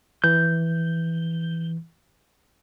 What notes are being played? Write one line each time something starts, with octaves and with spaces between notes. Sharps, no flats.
E3 G6